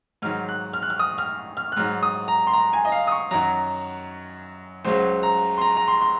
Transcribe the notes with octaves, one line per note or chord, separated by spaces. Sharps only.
G#2 D#3 F#3 F6
F#6
F6
F#6
F6
D#6
F6
F6
F#6
G#2 F#3 F6
D#6
A#5
C6
A#5
G#5
D#5
F5
D#6
C#6
F#2 D#3 F#3 A#5
C#2 C#3 F#3 C5
A#5
C6
A#5
A#5
C6
C6